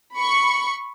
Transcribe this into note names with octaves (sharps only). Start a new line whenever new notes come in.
B5 C#6